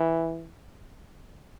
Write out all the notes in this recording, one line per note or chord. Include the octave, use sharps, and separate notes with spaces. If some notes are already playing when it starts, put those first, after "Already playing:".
Already playing: E3